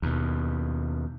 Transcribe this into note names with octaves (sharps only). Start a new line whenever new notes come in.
D#2 B2